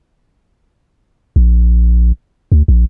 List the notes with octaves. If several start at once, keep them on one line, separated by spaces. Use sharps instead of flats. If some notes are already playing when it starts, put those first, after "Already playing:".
A#1
D2
A#1